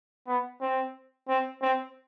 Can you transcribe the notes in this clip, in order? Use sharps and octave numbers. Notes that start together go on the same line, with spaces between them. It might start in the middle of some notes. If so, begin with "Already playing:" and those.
B3
C4
C4
C4